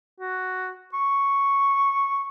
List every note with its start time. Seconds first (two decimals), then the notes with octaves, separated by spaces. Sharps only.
0.20 F#4
0.94 C#6